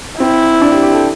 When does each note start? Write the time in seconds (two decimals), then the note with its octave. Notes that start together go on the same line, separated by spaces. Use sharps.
0.20 C4 E4
0.61 D4
0.71 G4
0.82 G4
0.92 A4